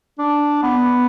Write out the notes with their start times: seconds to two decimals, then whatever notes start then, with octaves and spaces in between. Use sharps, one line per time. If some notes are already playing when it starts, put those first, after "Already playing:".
0.18 D4
0.63 B3